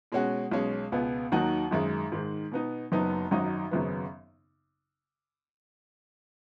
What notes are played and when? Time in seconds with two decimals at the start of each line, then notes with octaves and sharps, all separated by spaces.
0.12 B2 G#3 C#4 F#4
0.52 B1 B2 G#3 C#4
0.92 C#2 B2 B3
1.32 D#2 D#3 F#3 D#4 F#4
1.71 G#1 F#2 D#3 G#3
2.12 G#2 D#3 G#3
2.52 B2 B3 D#4
2.92 F#1 F#2 F#3 B3 D#4
3.31 G#1 F#2 F#3 D#4 F#4
3.71 G#1 F#2 C#3 F#3 B3